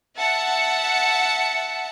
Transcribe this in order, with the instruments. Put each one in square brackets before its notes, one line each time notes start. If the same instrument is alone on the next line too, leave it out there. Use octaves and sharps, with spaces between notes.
[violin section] E5 F#5 A5 C#7